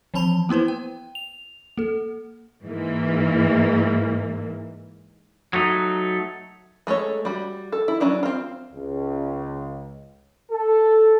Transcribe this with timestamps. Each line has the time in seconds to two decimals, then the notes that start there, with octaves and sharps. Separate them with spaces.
0.14 E3 F3 C4 A5 B5 F7
0.49 A#3 B3 E4 B4 C5
0.68 G5
1.15 F7
1.78 A#3 A4
2.64 G#2 E3 A#3
5.53 F#3 A3 D#4
6.87 G#3 A3 A4 C#5
7.25 G3 F#4
7.72 A4
7.88 E4
8.00 F#3 C#4 D4 E4
8.23 C4 F4
8.73 C#2
10.51 A4